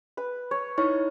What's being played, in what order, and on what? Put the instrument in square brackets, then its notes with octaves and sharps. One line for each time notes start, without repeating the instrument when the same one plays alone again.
[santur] B4 B5
C#5
[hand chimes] D#4 E4 C#5 [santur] C#6